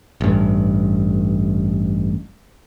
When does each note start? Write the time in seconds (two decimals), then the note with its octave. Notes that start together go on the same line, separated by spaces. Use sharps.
0.21 A1 G2